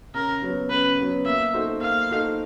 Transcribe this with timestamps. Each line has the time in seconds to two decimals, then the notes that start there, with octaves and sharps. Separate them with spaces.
0.14 C#3 A#4
0.42 F#3 B3
0.70 C#3 B4
0.98 F#3 B3
1.25 A#3 E5
1.53 D#4 F#4 A4 C5
1.81 A#3 F5
2.10 D#4 F#4 A4 C5